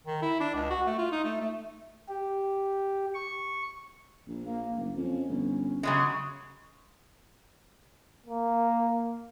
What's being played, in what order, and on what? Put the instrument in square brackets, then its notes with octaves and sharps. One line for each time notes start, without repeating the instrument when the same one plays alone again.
[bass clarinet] D#3
E4
D4
C#2
F#4
A3
F4
D#4
A3
A3
[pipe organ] G4
C#6
[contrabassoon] A#1
[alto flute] A#3
[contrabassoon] F#1
[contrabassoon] F2 [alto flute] C#4
[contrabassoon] G1
[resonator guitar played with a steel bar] C#3 F#3 G#3
[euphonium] A#3